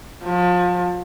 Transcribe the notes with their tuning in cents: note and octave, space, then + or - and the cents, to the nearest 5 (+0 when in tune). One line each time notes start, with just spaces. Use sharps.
F3 +30